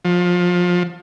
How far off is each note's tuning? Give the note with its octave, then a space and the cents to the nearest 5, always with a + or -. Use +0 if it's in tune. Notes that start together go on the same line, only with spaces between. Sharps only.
F3 +25